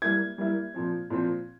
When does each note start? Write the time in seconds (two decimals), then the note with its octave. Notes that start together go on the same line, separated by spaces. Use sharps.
0.02 G3 A#3 E4 G#6
0.38 G3 A#3 E4
0.74 A#2 F3 C4
1.10 A#2 F3 C4